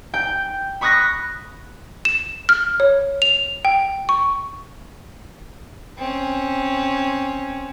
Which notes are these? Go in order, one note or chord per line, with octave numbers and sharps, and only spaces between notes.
G5 G6
B5 C#6 D#6 F#6 A#6
E7
F6
C#5
F7
G5
C#6
C4 C#4